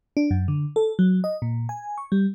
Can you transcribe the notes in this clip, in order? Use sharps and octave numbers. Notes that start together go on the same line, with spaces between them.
D4
F#2
D3
A4
F#3
D#5
A#2
G#5
C#6
G3